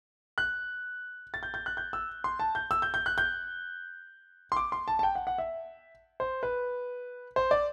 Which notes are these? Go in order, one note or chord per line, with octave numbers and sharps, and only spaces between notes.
F#6
A6
G6
G6
F#6
G6
E6
C6
A5
G6
E6
G6
G6
F#6
G6
C6
D6
C6
A5
A5
G5
F#5
F#5
E5
C5
B4
C5
D5